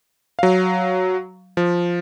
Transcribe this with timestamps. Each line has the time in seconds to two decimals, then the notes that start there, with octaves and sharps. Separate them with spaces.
0.39 F#3 F5
1.57 F3